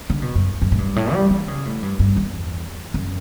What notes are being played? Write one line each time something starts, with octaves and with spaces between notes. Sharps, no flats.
D3
B2
F#2
F#2
A2
G2
A2
G3
E3
C#3
A2
G2
G2
E2
F#2